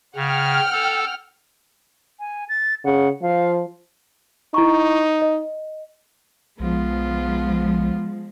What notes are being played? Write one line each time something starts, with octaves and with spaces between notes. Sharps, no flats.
C#3 F#5 G5 F6
A4
G#5
A6
C#3 F#5
F3 F5
D#4 E4 A#5 C#6
D#5
B1 F3 G#3 B3 F4